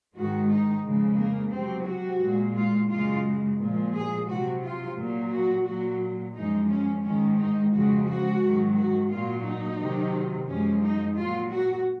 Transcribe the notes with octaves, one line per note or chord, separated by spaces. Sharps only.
G#2 D#3 G#3 F#4
D#4
F2 C#3 G#3
A#3
C3 F#3 C4
F#4
A#2 G#3
F4
F#2 C#3 G#3 F4
A#2 F3 G#3
G#4
C3 F#3 F#4
F4
A#2 F#3
F#4
A#2 F#3 F#4
F#2 F3 G#3 D#4
C#4
G#2 D#3 G#3 C#4
D#4
F2 C#3 F3 G#3 F#4
F#4
G#2 D#3 F#3
F#4
A#2 F#3 F4
D#4
C3 D#3 F#3
F#2 F3 G#3 C#4
D#4
A#2 F#3 F4
F#4